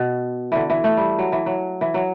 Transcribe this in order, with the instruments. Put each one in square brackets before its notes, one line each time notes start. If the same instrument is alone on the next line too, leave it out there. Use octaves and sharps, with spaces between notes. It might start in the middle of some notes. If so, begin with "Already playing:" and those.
Already playing: [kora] B2
D3 E3
E3
A3
G3
F#3
E3
F#3
E3
F#3